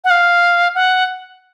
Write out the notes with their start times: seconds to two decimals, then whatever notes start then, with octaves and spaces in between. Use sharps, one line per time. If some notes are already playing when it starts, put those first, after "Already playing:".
0.04 F#5
0.10 F5
0.75 F#5